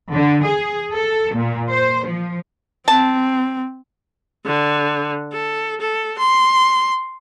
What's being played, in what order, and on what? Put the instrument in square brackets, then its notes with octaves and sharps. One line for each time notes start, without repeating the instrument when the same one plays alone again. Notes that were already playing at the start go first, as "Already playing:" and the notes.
[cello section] D3
G#4
A4
A#2
C5
F3
[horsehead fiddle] C4 [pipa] A5
[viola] D3
A4
A4
C6